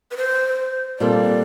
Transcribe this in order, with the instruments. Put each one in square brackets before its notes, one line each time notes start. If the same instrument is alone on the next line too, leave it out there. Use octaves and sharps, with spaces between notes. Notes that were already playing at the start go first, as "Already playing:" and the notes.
[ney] B4
C5
[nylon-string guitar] A#2 G3 C4 F4 A4 [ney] D5